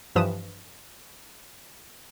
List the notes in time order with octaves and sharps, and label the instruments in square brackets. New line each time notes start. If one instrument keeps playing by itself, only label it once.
[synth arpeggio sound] G2 E3 F3 B4 D#6 E7